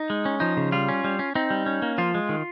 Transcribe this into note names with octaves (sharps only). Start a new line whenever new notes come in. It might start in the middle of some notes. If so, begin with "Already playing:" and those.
Already playing: D#4
G#3
C#4
F3 D#4
C#3
G3 F4
C#4
G3
C#4
C4 D#4
G3
C#4
A#3
F3 F4
G#3
D#3